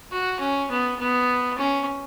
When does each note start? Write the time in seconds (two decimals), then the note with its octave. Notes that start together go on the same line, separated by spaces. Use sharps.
0.12 F#4
0.40 C#4
0.71 B3
0.99 B3
1.58 C#4